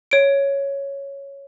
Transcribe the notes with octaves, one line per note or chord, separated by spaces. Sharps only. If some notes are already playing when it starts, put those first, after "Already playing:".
C#5 D7